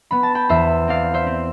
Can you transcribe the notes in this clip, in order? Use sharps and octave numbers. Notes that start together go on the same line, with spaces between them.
B3 B5
A5
G5 B5
E2 C5 E5
C4 D5 F5
C5 E5
C4